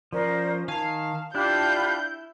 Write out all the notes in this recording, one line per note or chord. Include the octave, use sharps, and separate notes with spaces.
F3 C#4 A#4 C5 D5
D#3 F5 G#5 A5
D4 E4 F4 G4 B5 G6